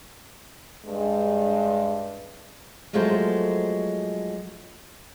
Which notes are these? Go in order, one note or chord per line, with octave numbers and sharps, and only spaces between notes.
G2 G#3
F3 F#3 G#3 A3 A#4 C5